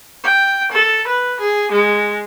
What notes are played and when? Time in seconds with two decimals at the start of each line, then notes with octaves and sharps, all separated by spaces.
0.24 G5
0.72 A4
1.08 B4
1.40 G#4
1.72 G#3